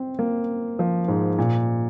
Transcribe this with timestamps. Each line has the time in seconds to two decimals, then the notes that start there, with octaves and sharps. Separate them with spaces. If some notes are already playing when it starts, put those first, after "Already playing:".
Already playing: C4
0.19 A#3
0.79 F3
1.08 G#2
1.38 A#2